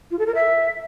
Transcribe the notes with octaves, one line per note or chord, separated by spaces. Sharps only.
F4
A4
A#4
E5